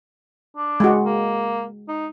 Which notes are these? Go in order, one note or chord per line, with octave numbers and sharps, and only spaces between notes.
D4
G#3 F#4
A#3
D#4